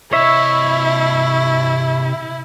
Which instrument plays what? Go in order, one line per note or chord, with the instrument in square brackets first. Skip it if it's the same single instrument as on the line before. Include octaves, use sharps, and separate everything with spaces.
[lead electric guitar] C3 D#5 [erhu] E4 [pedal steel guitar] C#5 E5